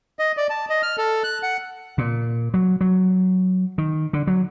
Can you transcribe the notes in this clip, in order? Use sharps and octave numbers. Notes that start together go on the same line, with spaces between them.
D#5
D5
A5
D#5
F6
A4
F#6
F#5
A#2
F#3
F#3
D#3
D3
F#3